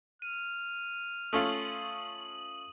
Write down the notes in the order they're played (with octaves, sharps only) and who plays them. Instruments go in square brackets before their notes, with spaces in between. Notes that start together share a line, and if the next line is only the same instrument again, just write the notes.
[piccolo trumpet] F6 [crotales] D#7
[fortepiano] A3 C#4 F4 [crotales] D#6 F#7